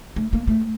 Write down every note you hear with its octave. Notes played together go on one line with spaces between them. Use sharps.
A3
A#3
A3